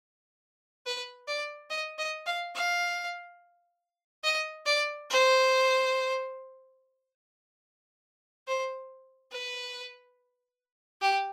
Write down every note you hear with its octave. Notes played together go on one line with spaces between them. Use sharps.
B4
D5
D#5
D#5
F5
F5
D#5
D5
C5
C5
B4
G4